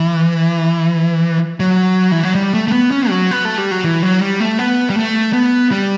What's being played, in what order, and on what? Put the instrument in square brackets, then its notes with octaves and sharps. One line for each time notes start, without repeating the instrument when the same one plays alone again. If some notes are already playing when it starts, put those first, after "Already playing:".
Already playing: [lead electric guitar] E3
F#3
E3
F#3
G3
A3
A3
B3
C#4
F#3
B3
A3
G3
F#3
E3
F#3
G3
A3
B3
G3
A3
B3
G3